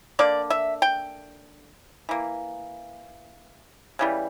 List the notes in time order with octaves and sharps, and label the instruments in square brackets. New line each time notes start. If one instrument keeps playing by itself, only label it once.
[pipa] D3 A#3 D5
E5
G5
E3 A#3
C#3 E3 G3